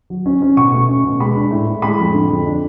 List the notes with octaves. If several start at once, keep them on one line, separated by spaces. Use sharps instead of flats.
F#3
C#4
C#4
B2 C#6
A3
C#4
B2
G#3 B5
D4
A2
A2
G#3 B5
F2
D3
F2
D4